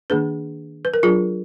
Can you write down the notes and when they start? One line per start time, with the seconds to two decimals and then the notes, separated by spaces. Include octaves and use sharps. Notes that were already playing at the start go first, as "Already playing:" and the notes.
0.10 D#3 A#3 D4 G#4 B4
0.85 B4
0.94 A#4
1.03 F#3 D4 F4 G#4